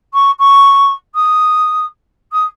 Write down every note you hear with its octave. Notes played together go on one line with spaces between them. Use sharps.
C#6
C#6
D#6
D#6